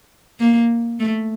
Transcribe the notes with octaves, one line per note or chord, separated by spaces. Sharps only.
A#3
A3